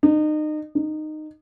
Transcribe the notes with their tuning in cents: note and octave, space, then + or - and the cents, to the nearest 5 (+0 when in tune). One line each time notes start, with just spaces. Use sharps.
D#4 -30
D#4 -15